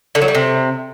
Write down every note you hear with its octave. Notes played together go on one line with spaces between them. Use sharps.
D3
F#3
G3
C3